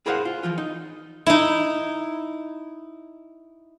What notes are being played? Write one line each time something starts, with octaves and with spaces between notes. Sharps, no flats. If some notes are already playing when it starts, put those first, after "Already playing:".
E4 G#4 A#4 C5 F5 F#5
F4
E3 F3 F4
D#4
D#4 E4